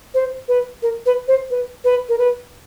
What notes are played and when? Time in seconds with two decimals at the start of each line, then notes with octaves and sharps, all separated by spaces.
0.14 C5
0.48 B4
0.83 A#4
1.06 B4
1.28 C5
1.50 B4
1.84 B4
2.09 A#4
2.18 B4